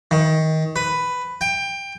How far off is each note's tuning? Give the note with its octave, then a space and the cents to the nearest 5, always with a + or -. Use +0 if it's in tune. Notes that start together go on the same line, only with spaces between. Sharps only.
D#3 +20
B4 +10
G5 +20